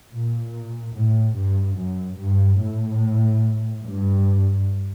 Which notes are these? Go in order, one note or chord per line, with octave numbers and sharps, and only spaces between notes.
A#2
A2
G2
F#2
G2
A2
G2